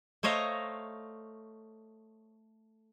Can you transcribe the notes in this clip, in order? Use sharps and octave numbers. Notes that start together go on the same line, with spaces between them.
A3 C5 C#5 D#5 F5 A#5